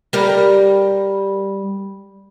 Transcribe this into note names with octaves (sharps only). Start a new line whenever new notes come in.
G3 G4 A#4